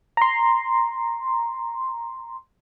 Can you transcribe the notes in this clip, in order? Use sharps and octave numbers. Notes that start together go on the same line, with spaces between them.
A#5 C6